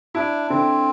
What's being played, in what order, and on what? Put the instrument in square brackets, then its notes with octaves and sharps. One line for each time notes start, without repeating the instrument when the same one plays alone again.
[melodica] D4 [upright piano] E4
[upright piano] D3 [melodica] C4